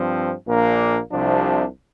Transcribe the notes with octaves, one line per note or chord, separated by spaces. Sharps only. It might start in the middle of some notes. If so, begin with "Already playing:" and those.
Already playing: G2 F3 C4
A#1 A#2 A#3 D4
C2 C3 F3 D4